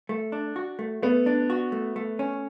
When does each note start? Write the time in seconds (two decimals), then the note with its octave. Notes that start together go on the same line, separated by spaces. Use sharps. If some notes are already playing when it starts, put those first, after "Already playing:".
0.09 A3
0.32 D4
0.56 F#4
0.79 A3
1.02 A3 B3
1.26 D4
1.50 F#4
1.72 A3
1.96 A3
2.19 C#4